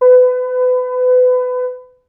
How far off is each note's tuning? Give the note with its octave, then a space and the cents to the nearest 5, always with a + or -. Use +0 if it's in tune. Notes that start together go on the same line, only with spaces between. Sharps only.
B4 +30